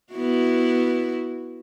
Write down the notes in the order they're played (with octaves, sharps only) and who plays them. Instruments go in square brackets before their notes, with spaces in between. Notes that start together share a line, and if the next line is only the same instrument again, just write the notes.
[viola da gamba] B3 E4 F#4